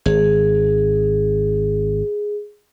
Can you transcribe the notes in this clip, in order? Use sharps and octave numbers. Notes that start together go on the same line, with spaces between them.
G#1 G#4